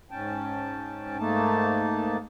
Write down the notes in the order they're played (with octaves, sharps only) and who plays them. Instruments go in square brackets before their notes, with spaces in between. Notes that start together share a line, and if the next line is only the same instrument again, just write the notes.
[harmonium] G#2 C#4 G5 A5
G#2 A3 A#3 D#4 A5